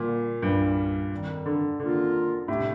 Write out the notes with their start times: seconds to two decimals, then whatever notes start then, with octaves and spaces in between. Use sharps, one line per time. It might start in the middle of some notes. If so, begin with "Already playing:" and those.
Already playing: A#2 D3 G3 A#3
0.42 C2 G2 A#2 G3
1.11 F2 D#3 G3
1.46 D3
1.80 F2 D3 D#3 A#3 F4 A#4
2.48 F2 A2 C3 G3 D4 G4